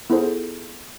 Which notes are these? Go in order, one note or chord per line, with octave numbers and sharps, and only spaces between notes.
B3 E4 F4 G#4 A4 C5